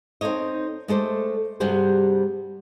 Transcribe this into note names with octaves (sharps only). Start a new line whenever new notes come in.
C4 D#4 A4 C#5 D#5
G#3 A3 A4 C5 D5
G2 C3 G3 F#4 G#4 C5